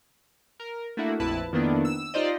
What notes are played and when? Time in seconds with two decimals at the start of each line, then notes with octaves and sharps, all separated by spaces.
0.60 A#4
0.97 A3 A#3 D4 E4 F#4
1.20 A#1 F2 E4 B4 A5
1.52 F2 D#3 A#3 B3 D4 E4
1.85 E6
2.14 D#4 F4 G4 C5 D5 D#5